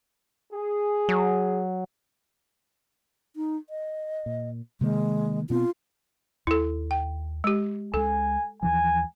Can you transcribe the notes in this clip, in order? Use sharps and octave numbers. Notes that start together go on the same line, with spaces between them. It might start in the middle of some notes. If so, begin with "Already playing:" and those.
G#4
F#3
D#4
D#5
A#2
C3 D#3 G#3 A#3
B2 B3 C4 F4
D#2 E4 A4
G5
G#3 G4
C#2 G#3 A4 G#5
D#2 E3 F3 G#5